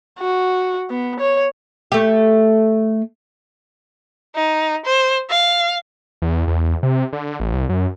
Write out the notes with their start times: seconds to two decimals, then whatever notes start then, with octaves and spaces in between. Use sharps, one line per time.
0.19 F#4
0.90 B3
1.20 C#5
1.92 A3 G4
4.36 D#4
4.86 C5
5.30 F5
6.22 E2
6.47 E2
6.83 C3
7.13 D3
7.40 A1
7.53 C2
7.69 F#2